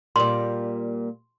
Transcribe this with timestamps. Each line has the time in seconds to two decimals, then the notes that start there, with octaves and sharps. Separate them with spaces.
0.16 A#2 G3 C6